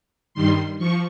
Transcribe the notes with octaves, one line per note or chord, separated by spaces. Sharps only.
G2 D#3 G3 C6
F3 C#6